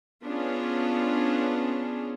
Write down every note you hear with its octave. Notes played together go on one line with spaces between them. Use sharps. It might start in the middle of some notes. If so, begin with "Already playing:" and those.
B3 C#4 D4 F4 G#4